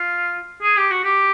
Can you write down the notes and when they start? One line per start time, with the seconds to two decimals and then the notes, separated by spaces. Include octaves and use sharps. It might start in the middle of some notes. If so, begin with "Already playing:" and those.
Already playing: F4
0.62 G#4
0.77 G4
0.91 F#4
1.04 G4